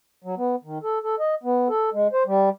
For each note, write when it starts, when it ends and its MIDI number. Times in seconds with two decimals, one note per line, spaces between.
0.24 0.35 54
0.37 0.56 59
0.64 0.78 51
0.83 0.99 69
1.03 1.15 69
1.19 1.35 75
1.44 1.68 59
1.69 1.90 69
1.93 2.07 56
2.12 2.23 72
2.26 2.49 55